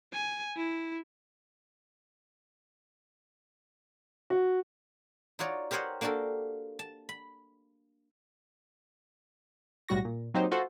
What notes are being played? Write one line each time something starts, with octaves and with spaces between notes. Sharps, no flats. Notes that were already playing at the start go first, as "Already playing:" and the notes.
G#5
E4
F#4
D#4 F4 F#4 C#5 D5
G4 A#4 C5 C#5 D#5 F#5
A#3 D4 F#4 G4 A4 A#4
A5
B5
B1 A2 G3 F#4 C#6 A#6
A#2
F#3 A#3 C4 D#4 G4 C5
F4 F#4 A4 C5